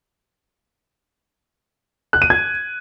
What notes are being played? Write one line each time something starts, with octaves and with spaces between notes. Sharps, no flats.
F#6
D#7
G#6